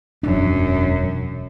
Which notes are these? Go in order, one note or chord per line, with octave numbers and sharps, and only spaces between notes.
E1 F#2 D4